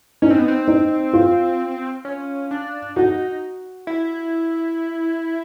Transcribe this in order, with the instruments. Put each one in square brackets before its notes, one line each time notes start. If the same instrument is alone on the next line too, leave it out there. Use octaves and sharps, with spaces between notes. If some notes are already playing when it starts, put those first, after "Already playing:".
[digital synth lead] C#4 [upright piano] D#4
[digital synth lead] C4
B3
C4
[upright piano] D#4
F4
[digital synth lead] C#4
D4
[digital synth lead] D#4 [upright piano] F#4
[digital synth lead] E4